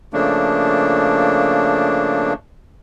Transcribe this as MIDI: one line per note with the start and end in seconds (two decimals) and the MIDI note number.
0.13 2.33 49
0.13 2.33 53
0.13 2.33 57
0.13 2.33 58
0.13 2.33 62